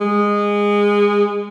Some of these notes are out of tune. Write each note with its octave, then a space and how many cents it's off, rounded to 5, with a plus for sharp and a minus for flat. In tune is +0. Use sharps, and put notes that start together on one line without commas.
G#3 -20